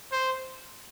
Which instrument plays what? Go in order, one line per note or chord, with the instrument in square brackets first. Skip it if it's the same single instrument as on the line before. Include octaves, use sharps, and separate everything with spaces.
[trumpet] C5